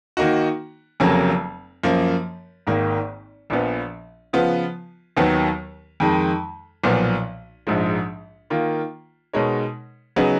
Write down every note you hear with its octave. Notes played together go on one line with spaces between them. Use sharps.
D#3 A#3 D#4 F#4
F1 F2 C#3 F#3 A#3
F#2 F3 A#3
G#1 G#2 D#3 A#3
A#1 A#2 F3 B3
C#3 F3 B3 F4
D#2 D#3 F#3 B3
F2 D#3 G#3
B1 A#2 F3 B3
A#1 G#2 F3 G#3
D#3 A#3 F4
B2 G#3 D#4 A#4 C#5
C#3 F#3 B3 D#4 G#4